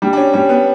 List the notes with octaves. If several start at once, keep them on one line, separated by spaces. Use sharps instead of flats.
G3 D4
D4
C#4
G3 C#4
B3